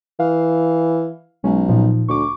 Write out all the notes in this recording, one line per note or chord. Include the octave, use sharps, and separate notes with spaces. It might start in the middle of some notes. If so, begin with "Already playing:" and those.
E3 F5
B1 G#3 C#4
A#2 F3 D#4
D2 C#6 D6